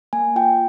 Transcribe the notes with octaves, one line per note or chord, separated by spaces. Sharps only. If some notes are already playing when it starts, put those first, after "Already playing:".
A#3 G#5
F4 G5